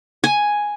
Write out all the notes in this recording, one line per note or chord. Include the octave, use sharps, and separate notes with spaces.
G#5